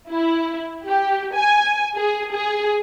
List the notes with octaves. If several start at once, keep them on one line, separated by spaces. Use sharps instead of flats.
E4
G4
G#5
G#4
G#4